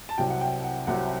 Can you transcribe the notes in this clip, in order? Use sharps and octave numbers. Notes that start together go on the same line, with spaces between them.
A5
C2 C3 F#3 G5
F#5
G5
F#5
C2 C3 F#3 F#5